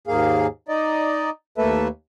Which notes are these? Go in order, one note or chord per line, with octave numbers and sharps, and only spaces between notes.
D#2 G#2 A#3 G#4 F5
D#4 D5 D#5
D#2 A3 A#3 A4 B4 E5